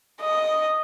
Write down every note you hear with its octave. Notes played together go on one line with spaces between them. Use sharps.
D#5